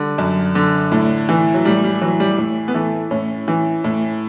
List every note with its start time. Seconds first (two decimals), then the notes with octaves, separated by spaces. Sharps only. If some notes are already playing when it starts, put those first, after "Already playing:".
Already playing: D3 G3
0.18 F#2
0.55 D3
0.92 A2
1.29 E3
1.54 F#3
1.65 A2 G3
1.84 G3
2.02 E3 F#3
2.20 G3
2.38 A2
2.68 B3
2.74 E3 A3
3.11 A2 C#4
3.48 E3
3.84 A2